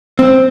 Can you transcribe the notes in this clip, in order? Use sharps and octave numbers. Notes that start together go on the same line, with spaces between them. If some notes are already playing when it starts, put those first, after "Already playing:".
C4